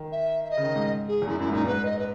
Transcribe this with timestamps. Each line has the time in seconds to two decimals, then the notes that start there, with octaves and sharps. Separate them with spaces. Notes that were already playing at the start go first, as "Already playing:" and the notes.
Already playing: D#3
0.12 E5
0.44 E5
0.50 D#5
0.57 C#3
0.63 D#3
0.75 G#2
1.08 G#4
1.22 E2
1.27 F#2 E4
1.40 F#2 E4
1.48 G#2
1.53 A#2 D#4
1.66 G#2 B4
1.85 D#5
1.99 B4